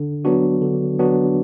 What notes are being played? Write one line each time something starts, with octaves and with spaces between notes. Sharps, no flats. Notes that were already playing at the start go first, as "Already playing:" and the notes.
Already playing: D3
F#3 B3 D4 F#4
D3
F#3 B3 D4 F#4